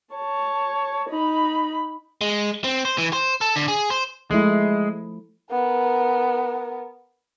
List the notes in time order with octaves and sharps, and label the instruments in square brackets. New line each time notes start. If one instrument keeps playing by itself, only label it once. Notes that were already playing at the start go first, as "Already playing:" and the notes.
[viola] C#5 A5
D#4 B5
[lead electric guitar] G#3
C4
C5
E3
C5
A4
D3
G#4
C5
[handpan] F3 A3 E4 [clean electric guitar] G#3
[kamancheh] B3 A#4